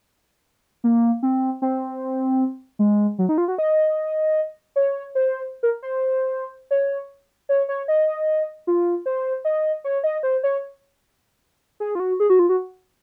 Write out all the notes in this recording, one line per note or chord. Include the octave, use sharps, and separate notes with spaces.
A#3
C4
C4
G#3
F#3
D#4
F4
F#4
D#5
C#5
C5
A#4
C5
C#5
C#5
C#5
D#5
F4
C5
D#5
C#5
D#5
C5
C#5
G#4
F4
F#4
G#4
F#4
F4
F#4